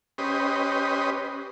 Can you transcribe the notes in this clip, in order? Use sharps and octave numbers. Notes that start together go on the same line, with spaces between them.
C#4 G4 B4 C5 D#5